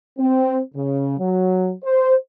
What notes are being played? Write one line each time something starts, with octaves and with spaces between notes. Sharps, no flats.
C4
C#3
F#3
C5